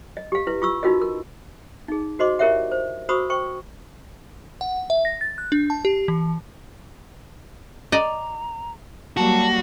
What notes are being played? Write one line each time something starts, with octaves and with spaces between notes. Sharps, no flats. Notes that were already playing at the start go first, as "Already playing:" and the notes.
D#5
G4 F5
E4 B4
F4 C#6 E6
D#4 F4 F#4 A#4 D#5
A#4
D#4 G#4
F#4 C5 D#5 C6 D6
E4 G4 A#4 C#5 E5 F#5
C5
F#4 C5 B5 C#6 D#6 E6
C5 G5 C#6
F#5
E5
A#6
A6
F#6
D4
A5
G4
E3
D5 D#5 A#5
F#3 G3 A#3 F#4 A5